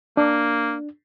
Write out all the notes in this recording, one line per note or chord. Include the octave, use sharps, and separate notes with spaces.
A#3 D4